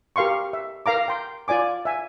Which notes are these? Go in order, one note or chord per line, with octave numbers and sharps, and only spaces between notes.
G4 A#4 F5 C6 C#6
E5
A#4 F5 A#5 D6
G5 C6
F4 D5 G#5 D6
E5 G#5